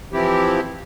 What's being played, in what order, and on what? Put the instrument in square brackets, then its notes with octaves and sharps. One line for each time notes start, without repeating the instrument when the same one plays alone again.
[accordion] E3 F3 C4 E4 G4